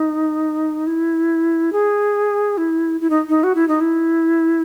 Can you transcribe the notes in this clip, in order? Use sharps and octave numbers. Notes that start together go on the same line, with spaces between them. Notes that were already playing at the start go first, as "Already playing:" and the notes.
Already playing: D#4
E4
G#4
E4
E4
D#4
D#4
F#4
E4
D#4
E4